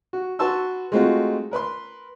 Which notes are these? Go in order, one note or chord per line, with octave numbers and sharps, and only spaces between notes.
F#4
F#4 B4 A5 C6 C#6 E6
G#3 A3 C4 D#4 F4 F#4
A#4 B4 B5 C6